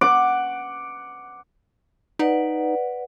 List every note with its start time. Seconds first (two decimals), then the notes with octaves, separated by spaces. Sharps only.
0.01 F#5 D6
2.19 D#4 B4 D5 F#5